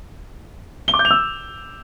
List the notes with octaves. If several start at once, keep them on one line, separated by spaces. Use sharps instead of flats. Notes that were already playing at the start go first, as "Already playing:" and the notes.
G7
D6
G6
F7
E6